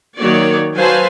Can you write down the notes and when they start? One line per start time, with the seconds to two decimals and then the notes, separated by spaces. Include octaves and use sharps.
0.18 D#3 F#3 A#3 C#5 D5
0.76 F#3 B4 C5 F5 G#5 A5